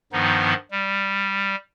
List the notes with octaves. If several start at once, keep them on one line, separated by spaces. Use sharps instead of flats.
G2 D#3 F3 B3 D#4
G3